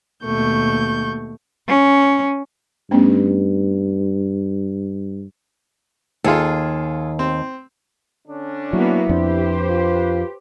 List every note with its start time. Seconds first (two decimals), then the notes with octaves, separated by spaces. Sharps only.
0.24 D#2 B2 A3 C#6 G6
1.69 C#4
2.91 G2 A3 B3 C#4
6.24 D#2 F4 G#4 A4
7.19 C4
8.28 D3 C#4 D4
8.73 F#3 A#3 B3 E4 F#4
9.09 F2 D4 G4 B4 C5
9.70 F4